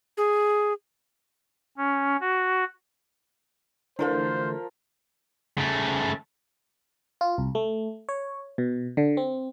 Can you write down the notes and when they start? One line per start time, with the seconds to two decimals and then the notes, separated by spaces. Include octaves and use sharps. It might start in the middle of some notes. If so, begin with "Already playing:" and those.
0.17 G#4
1.77 C#4
2.21 F#4
3.99 D3 E3 F3 A3 F4 A#4 C5
5.58 C#3 A3
7.21 F4
7.38 C2
7.55 A3
8.09 C#5
8.58 B2
8.97 D3
9.17 C4